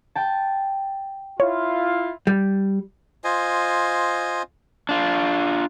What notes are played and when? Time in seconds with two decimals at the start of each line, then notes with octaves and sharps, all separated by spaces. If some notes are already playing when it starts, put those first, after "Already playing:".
0.15 G5 A5
1.40 E4 F4 C#5
2.27 G3
3.24 F4 C5 D#5 G#5
4.89 D4 F4